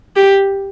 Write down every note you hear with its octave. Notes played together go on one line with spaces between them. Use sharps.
G4